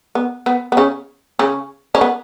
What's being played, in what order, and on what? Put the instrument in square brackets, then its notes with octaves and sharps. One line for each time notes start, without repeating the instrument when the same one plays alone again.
[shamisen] B3
B3
B3
C#3 C#4
C#3 C#4
C#4
B3